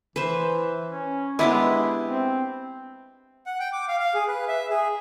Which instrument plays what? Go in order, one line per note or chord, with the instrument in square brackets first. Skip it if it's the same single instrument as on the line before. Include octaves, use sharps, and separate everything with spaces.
[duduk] E3 [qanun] B4 C5 E5
[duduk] C#4
[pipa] D3 E4 [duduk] G#3 [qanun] B3 D4 G4
[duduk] C4
[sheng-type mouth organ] F#5
G5
D6
F5
F5
G#4
B4
E5
G#4